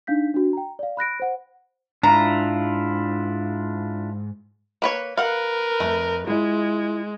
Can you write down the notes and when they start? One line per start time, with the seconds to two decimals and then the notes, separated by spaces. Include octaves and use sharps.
0.07 D4 D#4 F5 G6 B6
0.34 D4 F#4
0.53 G5 A#5
0.79 D5 F5
0.97 B5 F#6 A#6 D7
1.20 C5 F#5
2.03 G#2 D4 E4 F4 A#5
4.82 A#3 B4 C#5
5.17 A#4 B4 F5 F#5
5.80 F2 A3
6.27 G#3 E4 F4